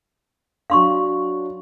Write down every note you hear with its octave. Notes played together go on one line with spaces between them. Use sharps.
F#3 D4 F5 C6 C#6